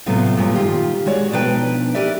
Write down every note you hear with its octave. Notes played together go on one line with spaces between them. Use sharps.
A2 C3 F#3 A3 B3 F4
G2 A#2 F3 C#5
D#3 F4 G4
G#3 F#4 C#5 D5
B2 F3 D4 D#4 B4 G5
G4 A#4 B4 D5 E5